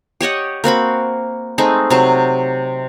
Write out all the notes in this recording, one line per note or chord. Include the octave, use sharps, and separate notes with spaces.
G4 C#5 D#5 F#5
A#3 C4 F#4 B5
G#3 A3 C4 D#4
C3 F#3 C5